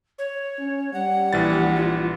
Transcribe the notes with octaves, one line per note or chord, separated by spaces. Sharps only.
C#5
C#4
G3 F#5
A#1 E3 A6
F4